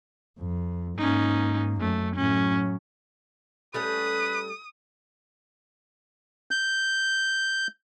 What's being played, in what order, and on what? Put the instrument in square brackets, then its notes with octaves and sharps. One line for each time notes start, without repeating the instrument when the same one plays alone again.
[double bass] F2
[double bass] G#2 A#3 [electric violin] C#4 D#4
[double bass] F#2 [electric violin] A3
[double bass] A2 F#3 [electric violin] C#4
[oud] G3 A3 C#4 [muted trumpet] B4 [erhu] D#6
[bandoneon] G6